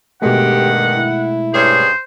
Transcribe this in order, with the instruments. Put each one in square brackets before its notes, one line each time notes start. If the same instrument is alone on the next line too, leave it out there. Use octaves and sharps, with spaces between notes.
[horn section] G2 D3 D#3 [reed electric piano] B2 G#3 A3 [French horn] G4 [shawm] F#5
[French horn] E4
[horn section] G2 C#4 G#4 [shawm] C5